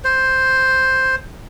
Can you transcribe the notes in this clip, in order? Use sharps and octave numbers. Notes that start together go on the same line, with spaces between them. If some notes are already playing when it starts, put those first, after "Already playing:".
C5